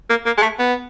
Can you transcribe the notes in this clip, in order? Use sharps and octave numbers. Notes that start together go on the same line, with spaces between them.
A#3
A#3
G#3
A3
B3